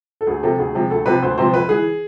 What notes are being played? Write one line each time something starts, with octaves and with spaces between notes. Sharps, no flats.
A4
D2 G#4
C3 F3 A4
D2 G#4
C3 F3
D2 A4
C3 F3 B4
D2 C5
C3 F3 C5
F2 B4
E3 G#4